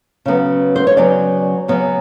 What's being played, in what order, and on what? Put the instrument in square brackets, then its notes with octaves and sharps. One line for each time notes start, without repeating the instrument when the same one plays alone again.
[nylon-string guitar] C#3 F#3 B3
C5
C#5
C#3 F#3 B3 D5
C#3 F#3 B3